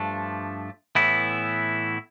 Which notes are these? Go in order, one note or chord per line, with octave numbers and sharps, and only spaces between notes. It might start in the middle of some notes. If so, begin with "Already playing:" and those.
Already playing: G2 F3 A3 D4
A2 E3 B3 E4